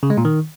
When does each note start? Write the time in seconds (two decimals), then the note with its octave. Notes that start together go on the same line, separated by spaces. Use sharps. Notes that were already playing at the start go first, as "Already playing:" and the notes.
0.03 C#3
0.10 G#3
0.17 A#2
0.25 D#3